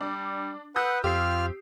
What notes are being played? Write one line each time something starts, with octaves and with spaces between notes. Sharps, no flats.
G3 D4
B4 F#5 D#6 E6 G6
F2 C4 F4 G4 F6 C7